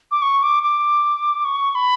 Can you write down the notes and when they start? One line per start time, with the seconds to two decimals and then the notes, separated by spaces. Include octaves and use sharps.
0.11 D6
0.22 C#6
0.43 D6
0.63 D6
1.45 C#6
1.75 B5